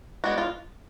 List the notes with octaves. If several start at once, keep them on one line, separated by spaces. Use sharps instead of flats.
G#3 B3 D4 F#4
F4